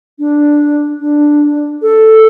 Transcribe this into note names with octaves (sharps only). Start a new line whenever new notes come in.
D4
D4
A4